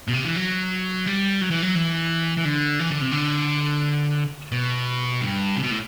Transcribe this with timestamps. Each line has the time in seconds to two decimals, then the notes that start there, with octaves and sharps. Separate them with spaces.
0.09 B2
0.14 C3
0.25 E3
0.36 F#3
1.06 G3
1.41 F#3
1.50 E3
1.62 F#3
1.75 E3
2.37 E3
2.45 D3
2.79 E3
2.90 D3
3.01 C3
3.11 D3
4.52 B2
5.21 G2
5.56 C3
5.62 B2
5.71 A2